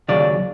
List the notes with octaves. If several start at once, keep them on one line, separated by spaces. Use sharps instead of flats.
D#2 C#3 F#3 D5